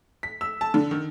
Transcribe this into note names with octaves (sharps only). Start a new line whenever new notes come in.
B6
E6
A5
D3
D#3